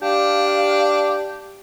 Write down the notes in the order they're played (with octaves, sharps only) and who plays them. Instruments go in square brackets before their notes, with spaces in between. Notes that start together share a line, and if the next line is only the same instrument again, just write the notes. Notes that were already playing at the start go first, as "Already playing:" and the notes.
[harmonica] D4 [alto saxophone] G4 [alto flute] F5